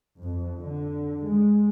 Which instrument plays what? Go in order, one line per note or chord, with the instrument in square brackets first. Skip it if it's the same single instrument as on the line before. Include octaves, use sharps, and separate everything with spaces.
[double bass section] F2
D3
G#3